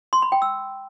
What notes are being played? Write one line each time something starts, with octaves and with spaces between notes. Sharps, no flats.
C6
B5
G5
E6